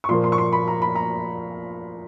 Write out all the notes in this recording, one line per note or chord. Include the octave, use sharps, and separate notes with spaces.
C#6
A#2 F3 A#3 C6
C6
C#6
C6
B5
A#5
B5
A#5